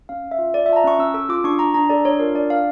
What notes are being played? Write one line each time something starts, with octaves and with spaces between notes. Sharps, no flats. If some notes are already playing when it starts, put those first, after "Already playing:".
C#4 F5
C#4
E5
F4
A4 D5
E5
F4 A5
A#5
C#4 C#6
C#4 E6
A4 E6
F4 D6
D4 C#6
D4 A#5
D4 A#5
A4 D5
D4 C#5
F4 A#4
D4 D5
A4 F5